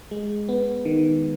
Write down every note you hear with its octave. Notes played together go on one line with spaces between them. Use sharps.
G#3
B3
D#3